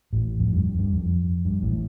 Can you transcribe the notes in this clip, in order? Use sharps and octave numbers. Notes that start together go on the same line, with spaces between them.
A1 A2
F2
G2
F2
G2
F2
G2
A1 A2